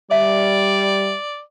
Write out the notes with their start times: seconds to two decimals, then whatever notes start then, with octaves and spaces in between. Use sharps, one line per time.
0.11 G3 D5 E5